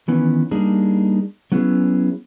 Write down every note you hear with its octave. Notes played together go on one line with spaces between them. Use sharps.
D#3 E3 B3 C#4
G3 A#3 D4 D#4 G#4
F#3 B3 C#4 E4 G#4